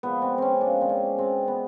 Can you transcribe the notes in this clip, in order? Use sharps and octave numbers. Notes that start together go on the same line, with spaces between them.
A#2 F3 G#3 B3
C4
C4 C#4
A#2 F3 G#3 D4
C4
C#4
B2 G#3 C4
B3